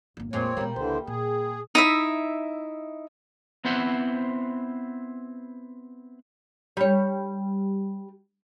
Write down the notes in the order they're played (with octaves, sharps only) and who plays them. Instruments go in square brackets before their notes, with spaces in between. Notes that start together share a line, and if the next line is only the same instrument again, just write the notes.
[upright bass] G1 A#3
[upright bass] F2 A3 [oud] A#2 G#3 [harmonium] C4 C#5
[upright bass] B2 G#3 [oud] G3 A#3
[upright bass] C#2 [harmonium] D3 E3 C5
[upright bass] A#2 [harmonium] G#4
[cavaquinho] D#4 E4 E5
[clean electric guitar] B3 C4 E4 C5 F#5
[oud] G3 C#5